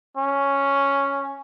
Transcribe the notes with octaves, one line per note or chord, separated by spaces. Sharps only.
C#4